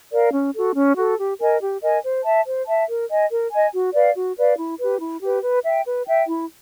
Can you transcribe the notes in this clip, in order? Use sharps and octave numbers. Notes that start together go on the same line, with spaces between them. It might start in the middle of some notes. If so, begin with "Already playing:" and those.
A#4 D5 F5
C#4
F#4 A4
C#4
F#4 A4
G4
A#4 D#5 G#5
G4
A#4 D#5 G#5
C5
E5 A5
C5
E5 A5
A#4
D#5 G#5
A#4
D#5 G#5
F#4
B4 D5 F5
F#4
B4 D5 F5
E4
G4 B4
E4
G4 B4
B4
E5 G5
B4
E5 G5
E4